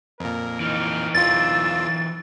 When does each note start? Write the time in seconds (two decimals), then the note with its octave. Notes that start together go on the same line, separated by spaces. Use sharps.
0.20 F2 A#2 A#4
0.60 E3 D#4 F6
1.15 E2 F4 E6 A6